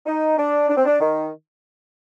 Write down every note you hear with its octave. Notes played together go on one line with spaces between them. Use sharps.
D#4
D4
D4
C4
D4
D#3